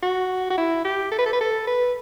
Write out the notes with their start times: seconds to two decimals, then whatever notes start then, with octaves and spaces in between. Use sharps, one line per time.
0.03 F#4
0.50 F#4
0.58 E4
0.85 G4
1.12 A4
1.19 B4
1.26 A4
1.33 B4
1.41 A4
1.67 B4